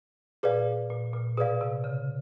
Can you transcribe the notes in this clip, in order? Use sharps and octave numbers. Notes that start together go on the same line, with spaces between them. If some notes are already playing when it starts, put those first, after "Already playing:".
A#2 G#4 B4 D5 F5
A#2
A#2
B2 G#4 B4 D5 F5
C3
C#3